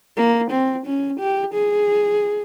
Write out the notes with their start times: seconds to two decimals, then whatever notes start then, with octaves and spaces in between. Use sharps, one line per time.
0.17 A#3
0.51 C4
0.86 C#4
1.20 G4
1.54 G#4